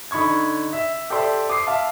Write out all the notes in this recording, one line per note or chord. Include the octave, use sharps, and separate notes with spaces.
D3 D#4 B5 C#6 G#6
E5
G4 A4 C5 D5 E5 C6
D6 D#6 C7
E5 F5 A5